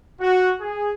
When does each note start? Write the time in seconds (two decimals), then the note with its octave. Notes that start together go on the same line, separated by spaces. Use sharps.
0.21 F#4
0.61 G#4